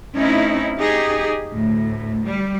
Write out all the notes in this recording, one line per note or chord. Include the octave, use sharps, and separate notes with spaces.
A3 C4 C#4 D#4 E4
D#4 G4 G#4
D2 A2
G3